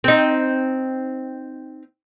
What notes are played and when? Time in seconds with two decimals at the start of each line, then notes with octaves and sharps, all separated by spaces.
0.04 C4 D#4